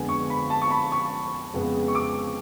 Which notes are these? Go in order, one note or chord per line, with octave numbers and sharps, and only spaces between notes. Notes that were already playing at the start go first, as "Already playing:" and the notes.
Already playing: F2 D3 G#3 B3 G#5
C#6
B5
A5
C#6
B5
C#6
F2 C#3 G#3 B3
C#6
D6